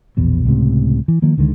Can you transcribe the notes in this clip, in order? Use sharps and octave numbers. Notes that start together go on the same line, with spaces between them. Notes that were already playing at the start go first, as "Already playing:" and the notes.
A#1 E2 B2
C#2 A2 C3
E3
D#3 F3 A#3
C#2 D3 D#3 G#3